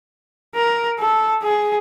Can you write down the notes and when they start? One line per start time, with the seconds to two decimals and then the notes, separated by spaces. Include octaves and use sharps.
0.55 A#4
0.99 A4
1.43 G#4